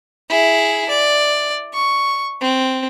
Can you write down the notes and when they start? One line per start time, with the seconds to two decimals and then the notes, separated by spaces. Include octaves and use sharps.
0.29 E4 G#4
0.89 D5
1.74 C#6
2.41 C4